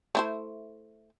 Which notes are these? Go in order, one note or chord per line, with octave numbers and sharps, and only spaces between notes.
A3 E4 C5